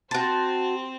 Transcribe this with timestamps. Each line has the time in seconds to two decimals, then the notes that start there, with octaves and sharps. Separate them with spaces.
0.11 C4 F#4 C5 A5